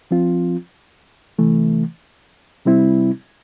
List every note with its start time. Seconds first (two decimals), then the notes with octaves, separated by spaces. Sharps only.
0.11 F3 C4 F4
1.38 C3 E3 A3
2.65 C3 G3 C4 E4